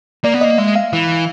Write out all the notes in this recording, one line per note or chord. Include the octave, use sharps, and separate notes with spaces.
A#3 D5
B3
A#3 D#5
G#3 E5
F5
E3